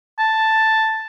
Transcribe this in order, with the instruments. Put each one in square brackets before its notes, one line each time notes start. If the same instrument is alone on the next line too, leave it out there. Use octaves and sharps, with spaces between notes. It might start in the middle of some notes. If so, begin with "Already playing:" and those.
[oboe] A5